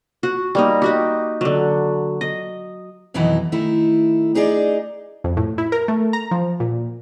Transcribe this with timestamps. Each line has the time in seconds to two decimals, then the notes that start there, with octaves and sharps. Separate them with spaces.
0.23 F#4
0.55 G3 A#3 D#4
0.82 D#4 F#4 G4
1.41 D3 F#3
2.21 D#5
3.14 F2 B2 D#3 E3 F#3 E4
3.52 D#3 A3 E4
4.35 D4 D#4 G#4 A#4 D5
5.24 F2
5.37 A2
5.58 E4
5.72 A#4
5.88 A3
6.13 A#5
6.31 F3
6.60 A#2